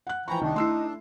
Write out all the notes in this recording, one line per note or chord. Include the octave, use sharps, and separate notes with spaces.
F#5 F#6
E3 F3 G5 G#5 A#5 B5 C#6
C2 D#3 D4 D#4
A3 E4 C6 E6 C7